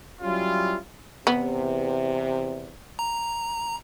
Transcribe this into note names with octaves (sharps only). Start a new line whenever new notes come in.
F#3 G3 C#4 E4 F4
E2 C3 B3
A#5